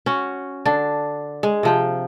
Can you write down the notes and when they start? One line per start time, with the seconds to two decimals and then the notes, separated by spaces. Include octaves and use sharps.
0.06 C#4 F#4
0.65 D3 D4
1.43 G#3
1.63 C3 F3 G5